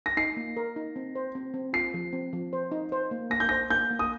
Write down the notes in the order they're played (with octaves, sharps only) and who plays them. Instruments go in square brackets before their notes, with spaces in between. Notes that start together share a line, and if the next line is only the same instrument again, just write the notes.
[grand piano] A#6
[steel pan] D#4 [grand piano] C7
[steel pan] A#3
A#4
D#4
C4
C5
C4
C4
[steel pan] F4 [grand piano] C7
[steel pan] F3
C4
F3
C5
D#4
C5
A#3
[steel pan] A#3 [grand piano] A#6
[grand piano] G6
[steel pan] C5 [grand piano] A#6
[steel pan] A#3 [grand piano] G6
[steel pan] A#3
[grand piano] D#6